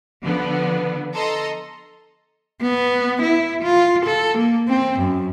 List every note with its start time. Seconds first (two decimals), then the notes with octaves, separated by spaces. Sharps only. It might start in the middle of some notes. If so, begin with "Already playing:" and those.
0.21 D3 F3 B3
1.14 A4 D#5 A#5 C6
2.62 B3
3.22 E4
3.63 F4
4.06 A4
4.38 A#3
4.69 C4
5.00 F#2